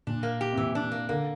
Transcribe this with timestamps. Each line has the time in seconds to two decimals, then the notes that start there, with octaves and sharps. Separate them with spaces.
0.07 A#2 D4
0.23 A#3
0.41 G4
0.53 C3
0.57 A#2 E3
0.75 D4
0.92 A#3
1.09 D3 A#3